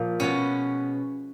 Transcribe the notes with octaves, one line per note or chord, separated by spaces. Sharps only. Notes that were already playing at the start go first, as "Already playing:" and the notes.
Already playing: A#2 F3
B2 G#3 B3 C#4